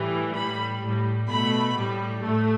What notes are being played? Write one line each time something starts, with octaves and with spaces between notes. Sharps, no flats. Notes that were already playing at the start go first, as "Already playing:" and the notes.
Already playing: A2 E3 G3
A2 G3 B5
A2
G3
B2 A3 B5
A2 G3
A2 A3